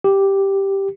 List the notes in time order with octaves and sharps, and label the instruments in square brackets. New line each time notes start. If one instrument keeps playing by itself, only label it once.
[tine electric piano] G4